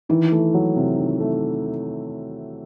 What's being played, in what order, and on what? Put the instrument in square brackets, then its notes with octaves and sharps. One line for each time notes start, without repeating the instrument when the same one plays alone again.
[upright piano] D#3 [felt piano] E3
[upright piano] A3
F#3
C3
D#3
A3